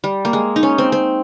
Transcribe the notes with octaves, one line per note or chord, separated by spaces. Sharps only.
G3
A#3
G#3
D#4
C#4
C4
C4